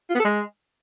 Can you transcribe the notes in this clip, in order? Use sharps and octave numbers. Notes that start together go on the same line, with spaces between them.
F4
B3
A4
G#3